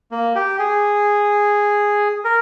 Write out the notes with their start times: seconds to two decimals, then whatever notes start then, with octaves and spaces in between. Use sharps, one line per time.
0.11 A#3
0.35 G4
0.59 G#4
2.25 A#4